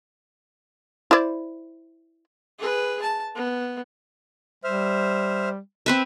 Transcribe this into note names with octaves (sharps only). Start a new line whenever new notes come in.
E4 C5 D5
G#4 B4
A5
B3
G3 C5 E5 F6
C4 B4 E5